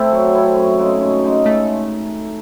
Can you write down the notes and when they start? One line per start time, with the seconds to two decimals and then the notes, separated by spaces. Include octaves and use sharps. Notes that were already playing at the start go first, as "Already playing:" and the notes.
Already playing: A3 C4 E4 A4
0.11 F#3
0.33 C4 E4 A4
0.56 F#2
0.78 C#3 G#3 D#4
1.01 F#2
1.24 C#3 G#3 D#4
1.46 A3